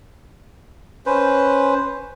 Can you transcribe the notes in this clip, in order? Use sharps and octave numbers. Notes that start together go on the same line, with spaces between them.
C#4 B4 C5